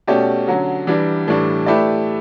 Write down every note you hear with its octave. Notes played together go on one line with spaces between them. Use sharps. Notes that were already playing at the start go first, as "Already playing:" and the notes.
B2 A3 C#4 G4 D5
D3 F#3 C#4
E3 G3 D4
A2 E3 G3 D4
A3 E4 G4 B4 D5